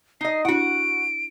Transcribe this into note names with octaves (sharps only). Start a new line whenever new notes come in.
D#4 D#5 C7
D4 E4 F#4 F#5 D7